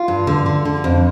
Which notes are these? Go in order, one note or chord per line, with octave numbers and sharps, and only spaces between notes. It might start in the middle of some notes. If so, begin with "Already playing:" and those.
Already playing: F4
G2
D3
D3
D3
F2